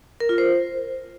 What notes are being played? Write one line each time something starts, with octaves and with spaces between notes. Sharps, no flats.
A#4
F4
C5